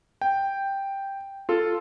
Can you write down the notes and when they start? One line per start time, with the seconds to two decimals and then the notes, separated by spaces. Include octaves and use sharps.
0.21 G5
1.49 F4 A4